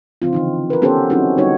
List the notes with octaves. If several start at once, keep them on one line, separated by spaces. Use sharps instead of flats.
C#3 F3 C4 F4
D3 E3 D#4
A#4 B4
B3 C#4 G4 A4 A#4 C5
F#3 C4 C#4 D#4 E4 F#4
D3 G3 D#4 F#4 C#5